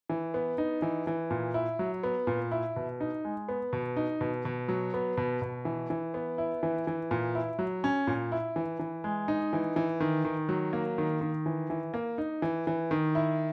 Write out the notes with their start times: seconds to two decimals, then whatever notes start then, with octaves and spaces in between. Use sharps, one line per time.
0.09 E3
0.34 B3
0.58 D#4
0.82 E3
1.07 E3
1.31 A#2
1.54 E4
1.79 F#3
2.03 B3
2.27 A#2
2.52 E4
2.76 B2
3.00 D#4
3.25 G#3
3.49 B3
3.73 B2
3.96 D#4
4.21 B2
4.45 B2
4.68 F#3
4.94 B3
5.17 B2
5.42 B2
5.65 E3
5.90 E3
6.14 B3
6.38 E4
6.63 E3
6.87 E3
7.11 A#2
7.35 E4
7.59 F#3
7.84 C#4
8.07 A#2
8.32 E4
8.56 E3
8.79 E3
9.04 G#3
9.28 D#4
9.53 E3
9.76 E3
10.00 D#3
10.25 D#3
10.49 F#3
10.73 A#3
10.98 D#3
11.21 D#3
11.46 E3
11.70 E3
11.94 A#3
12.18 D#4
12.42 E3
12.67 E3
12.91 D#3
13.15 E4